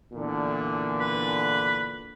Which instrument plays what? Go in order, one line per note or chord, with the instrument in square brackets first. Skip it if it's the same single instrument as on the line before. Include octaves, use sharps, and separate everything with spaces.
[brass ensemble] E2 A#2 D3
[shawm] B4